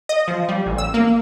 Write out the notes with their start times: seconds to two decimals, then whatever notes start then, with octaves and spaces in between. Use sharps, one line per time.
0.09 D#5
0.28 F3
0.49 G3
0.66 A1
0.78 E6
0.94 A#3